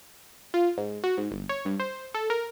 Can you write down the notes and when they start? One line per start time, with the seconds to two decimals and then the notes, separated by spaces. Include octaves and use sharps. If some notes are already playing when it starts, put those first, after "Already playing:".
0.54 F4
0.78 G#2
1.04 F#4
1.17 G#2
1.31 G1
1.49 C#5
1.65 G2
1.80 C5
2.14 A4
2.30 A#4